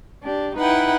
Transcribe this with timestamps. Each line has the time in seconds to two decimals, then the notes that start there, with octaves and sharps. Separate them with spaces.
0.23 D4 G4
0.56 D#4 E4 B4 F#5 G5